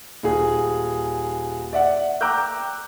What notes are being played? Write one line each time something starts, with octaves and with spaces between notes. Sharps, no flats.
D#1 G#4
D5 E5 F#5
G5 A#5 D6 E6 F#6 G6